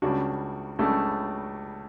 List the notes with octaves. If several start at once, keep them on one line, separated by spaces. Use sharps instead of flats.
C#2 C#3 G3 D4 F#4
C#2 C#3 G3 A3 D4 A4